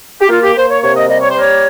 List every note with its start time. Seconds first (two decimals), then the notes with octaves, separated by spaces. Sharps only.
0.21 G4
0.29 A#3 F4
0.42 G4
0.56 A#3 C5
0.70 C#5
0.82 C3 C#5
0.96 D#5
1.09 G3 D#5
1.22 C#5
1.31 C5
1.36 A#3 C#5